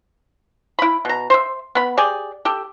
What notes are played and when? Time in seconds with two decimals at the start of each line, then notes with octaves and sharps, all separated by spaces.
0.79 E4 B5
1.05 B2 A#5
1.30 C5 E5
1.75 B3 B5
1.97 G4 G#4 D5
2.45 G4 A4